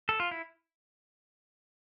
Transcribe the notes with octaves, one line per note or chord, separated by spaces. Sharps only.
A4
F4
E4